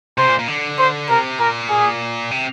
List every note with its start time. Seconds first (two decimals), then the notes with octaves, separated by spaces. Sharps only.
0.18 C3 C5
0.29 A#2
0.39 A#2
0.48 D3
0.79 C5
1.09 C3 A#4
1.39 A#2 A#4
1.69 G#4
2.31 C3